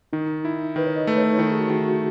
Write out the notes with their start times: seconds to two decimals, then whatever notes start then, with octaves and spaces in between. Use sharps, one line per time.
0.13 D#3 D#4
0.45 E4
0.76 D#3 B4
0.87 C#5
0.96 D#5
1.07 A3 B4
1.17 C#5
1.28 D#4
1.38 D#3 E4
1.52 G#4
1.60 F#4
1.70 D#3
1.80 F#4